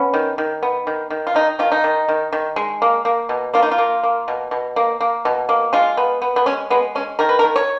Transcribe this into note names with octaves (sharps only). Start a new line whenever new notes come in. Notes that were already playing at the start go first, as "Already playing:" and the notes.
Already playing: B3 C#4
D#3
D#3
B3
D#3
D#3
F4
D#3 D#4
D#3 F4
D#4
D#3
D#3
D#3
G#3
A#3
A#3
B2
A#3 F4
D#4
F4
A#3
A#3
B2
B2
A#3
A#3
B2
A#3
G#3 F4
B3
B3
B3
G#3 C#4
G#3 B3
G#3 C#4
D#3 A#4
B4
A#4
D#3
C#5